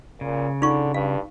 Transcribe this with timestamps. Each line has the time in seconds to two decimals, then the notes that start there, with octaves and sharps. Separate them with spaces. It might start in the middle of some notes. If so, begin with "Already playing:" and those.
0.21 A#2 C#3
0.62 D3 D#4 F4 C#6
0.94 G2 F5